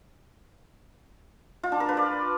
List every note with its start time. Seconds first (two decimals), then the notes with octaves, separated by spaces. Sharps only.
1.63 F4
1.72 D4
1.80 A#4
1.89 B4
1.97 D5